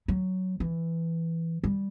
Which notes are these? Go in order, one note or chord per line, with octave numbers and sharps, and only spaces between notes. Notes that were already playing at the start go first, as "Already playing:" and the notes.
F#3
E3
G3